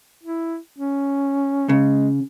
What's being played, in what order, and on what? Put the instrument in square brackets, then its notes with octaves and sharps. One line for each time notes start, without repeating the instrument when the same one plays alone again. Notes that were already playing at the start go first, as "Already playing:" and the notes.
[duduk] E4
C#4
[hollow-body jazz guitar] C#3 [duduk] G#3